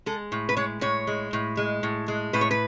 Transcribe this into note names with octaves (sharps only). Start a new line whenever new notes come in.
G#3 A4
A2
B4
G#3 C#5
A2 C#5
G#3
A2
G#3
A2
G#3
A2 B4
C#5
B4